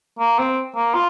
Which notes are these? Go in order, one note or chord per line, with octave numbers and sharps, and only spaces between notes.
A#3
C4
A#3
F4